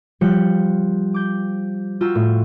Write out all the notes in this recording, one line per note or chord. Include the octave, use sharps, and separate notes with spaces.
F3 G3 G5 F#6 C#7
D6 G6
F4 F#4 G5 A#5 C6 E6
A2